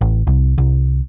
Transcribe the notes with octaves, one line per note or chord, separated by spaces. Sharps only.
A1
C2
C2